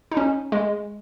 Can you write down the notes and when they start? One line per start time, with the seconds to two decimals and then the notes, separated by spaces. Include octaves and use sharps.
0.11 D#4
0.17 C#4
0.52 G#3